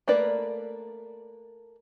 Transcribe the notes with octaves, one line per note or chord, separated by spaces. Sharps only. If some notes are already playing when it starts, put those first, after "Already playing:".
A3 A#3 A#4 B4 D5